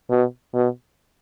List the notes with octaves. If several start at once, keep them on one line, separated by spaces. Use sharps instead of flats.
B2
B2